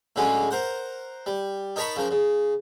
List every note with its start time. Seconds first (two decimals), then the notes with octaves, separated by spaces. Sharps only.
0.16 A2 D3 F#3 G#3 C#4
0.51 A#4 C5 F#5
1.26 G3
1.76 D#4 A#4 C#5 A5 B5 C#6
1.96 C#3 F3 A#4
2.11 C#3